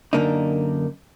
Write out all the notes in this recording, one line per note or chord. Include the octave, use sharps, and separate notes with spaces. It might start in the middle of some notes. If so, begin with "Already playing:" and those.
F#2 D3 A#3 D4 D#4